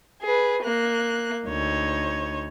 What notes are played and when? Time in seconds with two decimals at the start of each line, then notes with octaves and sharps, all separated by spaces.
0.22 G#4 B4
0.63 A#3 F#6
1.46 D2 D#4 C#5